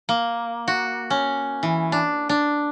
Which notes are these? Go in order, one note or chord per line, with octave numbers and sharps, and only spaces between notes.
A#3
F#4
C#4
E3
D4
D4